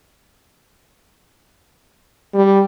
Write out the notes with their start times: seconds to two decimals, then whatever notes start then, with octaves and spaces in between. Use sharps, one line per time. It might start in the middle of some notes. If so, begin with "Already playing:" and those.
2.34 G3